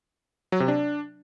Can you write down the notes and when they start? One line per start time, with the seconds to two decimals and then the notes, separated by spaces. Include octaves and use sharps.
0.52 F#3
0.60 C3
0.68 D4